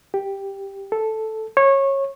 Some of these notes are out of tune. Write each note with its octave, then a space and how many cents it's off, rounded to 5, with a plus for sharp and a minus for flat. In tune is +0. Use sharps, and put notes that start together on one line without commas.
G4 +5
A4 -5
C#5 -20